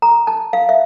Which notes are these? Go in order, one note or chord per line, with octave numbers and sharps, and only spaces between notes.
A#5
A5
F5
E5